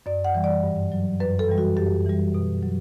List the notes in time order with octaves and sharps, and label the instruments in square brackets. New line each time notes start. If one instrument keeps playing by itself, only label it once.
[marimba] F#2 D5
F#5
E3 G3
D5
G2
F#3
F#2 B4
A4
E3 G3
F#4
F#2 G4
E3 G3
B2
F#3